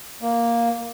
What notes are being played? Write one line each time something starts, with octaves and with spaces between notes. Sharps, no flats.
A#3